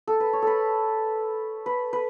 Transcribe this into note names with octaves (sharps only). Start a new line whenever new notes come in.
A4
B4
C#5
A4 B4
B4
B4